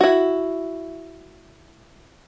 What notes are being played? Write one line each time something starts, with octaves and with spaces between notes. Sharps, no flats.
E4 F#4